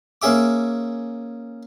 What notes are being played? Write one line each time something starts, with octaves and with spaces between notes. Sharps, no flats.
A#3 C#4 G#4 E5 D6